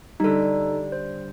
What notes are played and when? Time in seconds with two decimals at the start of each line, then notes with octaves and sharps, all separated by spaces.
0.20 D3 G3 D#4 A4
0.92 C5